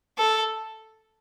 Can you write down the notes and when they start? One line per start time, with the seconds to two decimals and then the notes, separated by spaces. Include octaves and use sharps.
0.18 A4